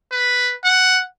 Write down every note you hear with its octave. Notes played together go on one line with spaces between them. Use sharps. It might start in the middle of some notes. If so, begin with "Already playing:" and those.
B4
F#5